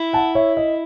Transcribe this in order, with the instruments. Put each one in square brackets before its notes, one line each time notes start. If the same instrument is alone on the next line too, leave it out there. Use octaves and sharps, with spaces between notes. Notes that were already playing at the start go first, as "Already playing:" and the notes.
Already playing: [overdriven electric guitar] E4
[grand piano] F#5 A5
C#5 E5
D#5